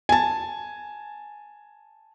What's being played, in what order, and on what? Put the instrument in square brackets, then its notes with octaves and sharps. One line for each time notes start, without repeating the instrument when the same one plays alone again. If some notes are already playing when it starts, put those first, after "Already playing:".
[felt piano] G#5 A5